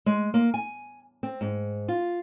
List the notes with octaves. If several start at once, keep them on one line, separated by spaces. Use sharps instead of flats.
G#3
A#3
G#5
C4
G#2
F4